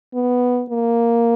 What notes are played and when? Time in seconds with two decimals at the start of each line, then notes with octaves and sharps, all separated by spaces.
0.14 B3
0.70 A#3